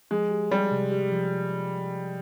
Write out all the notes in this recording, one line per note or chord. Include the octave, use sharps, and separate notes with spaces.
F3 G#3
G4
G3 G4
C3
G4
F3